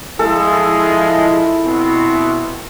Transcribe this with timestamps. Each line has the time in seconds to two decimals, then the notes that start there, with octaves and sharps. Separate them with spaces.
0.19 F3 G#3 E4 A4
1.64 B2 C4